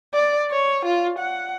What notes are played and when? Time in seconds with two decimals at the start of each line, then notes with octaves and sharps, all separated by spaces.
0.14 D5
0.51 C#5
0.85 F4
1.19 F#5